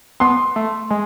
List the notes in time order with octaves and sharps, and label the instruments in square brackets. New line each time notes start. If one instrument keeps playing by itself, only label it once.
[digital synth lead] B3 [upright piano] C6
[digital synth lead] A3
G#3